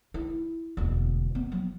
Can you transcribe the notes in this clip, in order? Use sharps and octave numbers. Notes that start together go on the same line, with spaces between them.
E4
E1 D2
B3
F#3